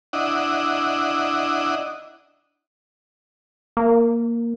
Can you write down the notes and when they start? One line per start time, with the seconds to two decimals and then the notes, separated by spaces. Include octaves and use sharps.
0.13 D4 E4 D#5 F#5
3.77 A#3